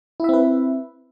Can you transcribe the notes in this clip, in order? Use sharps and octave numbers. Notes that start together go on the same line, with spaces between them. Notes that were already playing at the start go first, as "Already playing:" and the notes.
C4 E4 B4 E5